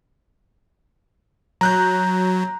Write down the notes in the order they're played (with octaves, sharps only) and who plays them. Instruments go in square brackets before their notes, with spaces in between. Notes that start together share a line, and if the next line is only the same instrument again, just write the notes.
[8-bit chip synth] F#3 [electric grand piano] A#5 F#6 G6